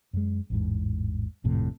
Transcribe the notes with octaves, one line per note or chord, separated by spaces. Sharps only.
F#2 G#3
A1 E2 G#2
G#1 F2 A2 C3